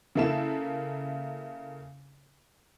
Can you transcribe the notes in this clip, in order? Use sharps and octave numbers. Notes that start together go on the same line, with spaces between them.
C#3 A#3 E4 A4 E7